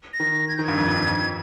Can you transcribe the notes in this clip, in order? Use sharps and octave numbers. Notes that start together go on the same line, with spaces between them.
A#6
D#3
G#6
D#3 G6
G2 G#6
F2
G2
F2